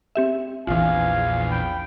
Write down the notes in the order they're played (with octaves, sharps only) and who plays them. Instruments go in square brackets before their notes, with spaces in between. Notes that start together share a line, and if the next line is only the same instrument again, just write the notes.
[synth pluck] C4 G4 E5
[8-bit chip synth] A#1 E2 [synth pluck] E3 F4 [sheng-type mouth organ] F5 [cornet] G#5
[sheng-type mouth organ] G5 [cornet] B5